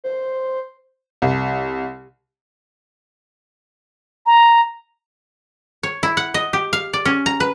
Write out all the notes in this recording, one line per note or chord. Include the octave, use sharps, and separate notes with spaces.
C5
C2
A#5
C#5
E4
F#5
D#5
G4
F5
D5
C#4
A#5
B4